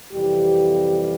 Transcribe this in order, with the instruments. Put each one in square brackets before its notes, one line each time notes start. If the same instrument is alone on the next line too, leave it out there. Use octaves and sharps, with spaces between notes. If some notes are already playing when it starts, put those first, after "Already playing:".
[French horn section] F2 C3 E3 G3 G4